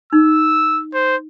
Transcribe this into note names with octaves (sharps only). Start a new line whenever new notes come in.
D#4 E6
C5